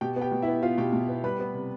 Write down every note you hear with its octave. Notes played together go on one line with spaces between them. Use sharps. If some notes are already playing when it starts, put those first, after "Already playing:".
B2 G4 G5
B3
G4 G5
B2
E4 E5
B3
B3 F4 F5
B2 G4 G5
B2
B3
G3 B4 B5
B3
C3